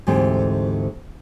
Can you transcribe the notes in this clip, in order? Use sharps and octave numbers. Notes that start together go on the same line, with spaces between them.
D2 G#2 E3 A3 C4 G4